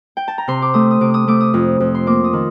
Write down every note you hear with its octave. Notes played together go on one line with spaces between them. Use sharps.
G5
A5
A#5
C3 C6
D6
A3 D#6
D#6
C3 D6
D#6
A3 D6
D#6
F2
F2
C6
A#3 D6
D#6
D#3